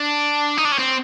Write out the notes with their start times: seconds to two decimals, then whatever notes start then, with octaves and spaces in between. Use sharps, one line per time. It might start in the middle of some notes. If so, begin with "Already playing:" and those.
Already playing: D4
0.57 D#4
0.65 D4
0.72 C#4
0.79 C4